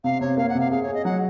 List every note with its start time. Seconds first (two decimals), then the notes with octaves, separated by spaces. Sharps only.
0.04 C3 F5
0.21 C3 C#5
0.37 A#3 F5
0.49 F#5
0.55 C3
0.60 F5
0.71 G#4 F5
0.83 G#4 C#5
0.94 D#5
1.05 F#3 F#5